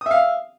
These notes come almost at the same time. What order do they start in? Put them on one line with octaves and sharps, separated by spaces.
D#6 E5 F5